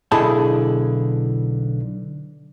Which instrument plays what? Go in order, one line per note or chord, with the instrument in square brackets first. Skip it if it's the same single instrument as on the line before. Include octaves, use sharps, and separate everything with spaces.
[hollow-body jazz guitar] B1 D3 E4 G#4 A5